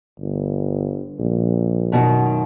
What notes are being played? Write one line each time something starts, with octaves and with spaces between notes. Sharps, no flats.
G1
A#1
F#2 B2 D#3